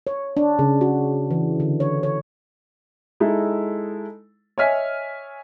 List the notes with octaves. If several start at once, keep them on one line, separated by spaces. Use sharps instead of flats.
C#5
D4
C#3
F#4
E3
D3
C#5
C#5
G#3 D#4 E4 A4
C#5 D#5 E5 G#5 F6 B6